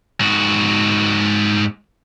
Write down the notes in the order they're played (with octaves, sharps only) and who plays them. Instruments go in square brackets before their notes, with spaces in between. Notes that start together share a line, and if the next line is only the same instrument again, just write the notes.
[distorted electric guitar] G#2 F#4